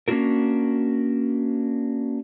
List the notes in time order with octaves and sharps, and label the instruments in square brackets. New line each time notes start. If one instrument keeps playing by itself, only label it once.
[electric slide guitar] A#3 C#4 D4 F4 F#4 A#4